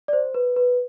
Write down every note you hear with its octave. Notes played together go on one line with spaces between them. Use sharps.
D5
C5
B4
B4